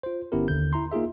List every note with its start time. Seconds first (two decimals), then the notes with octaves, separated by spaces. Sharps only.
0.03 F4 C5
0.32 G1 B3 C#4 E4 G4 A#4
0.48 D#2 D3 G6
0.73 E4 A#5 C6
0.92 A#3 D#4 F4 G#4 E5